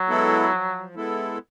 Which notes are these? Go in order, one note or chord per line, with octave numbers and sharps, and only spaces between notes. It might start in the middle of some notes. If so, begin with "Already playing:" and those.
Already playing: F#3
G#3 B3 E4 A4
F3
G#3 B3 E4 A4